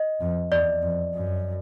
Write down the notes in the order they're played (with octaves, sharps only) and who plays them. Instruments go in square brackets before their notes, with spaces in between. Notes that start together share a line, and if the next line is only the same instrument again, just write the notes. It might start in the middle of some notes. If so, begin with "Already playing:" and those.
Already playing: [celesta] D#5
[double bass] F2
[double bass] E2 [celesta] D5
[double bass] F2
F#2